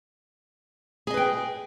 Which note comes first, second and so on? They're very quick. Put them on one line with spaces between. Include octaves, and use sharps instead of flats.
G#4 D#5 B4 G5